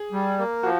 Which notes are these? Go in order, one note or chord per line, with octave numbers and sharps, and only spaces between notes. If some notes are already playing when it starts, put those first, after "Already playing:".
Already playing: G#4
G3
A#3
F3 F#4